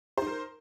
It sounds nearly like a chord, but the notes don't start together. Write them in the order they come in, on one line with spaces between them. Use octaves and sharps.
C5 D#4 A#4